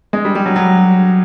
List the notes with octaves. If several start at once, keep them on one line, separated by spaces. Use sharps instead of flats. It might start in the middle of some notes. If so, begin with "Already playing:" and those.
G#3
G3
G3
F#3
F#3